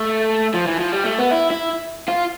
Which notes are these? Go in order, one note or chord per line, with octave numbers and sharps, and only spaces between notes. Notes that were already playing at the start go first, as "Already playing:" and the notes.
Already playing: A3
F3
E3
F3
G3
A3
B3
E4
E4
F4